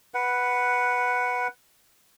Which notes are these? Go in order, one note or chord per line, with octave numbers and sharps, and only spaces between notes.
B4 F#5